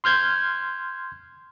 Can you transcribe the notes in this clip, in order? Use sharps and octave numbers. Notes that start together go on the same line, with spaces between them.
C6 F6 G6 G#6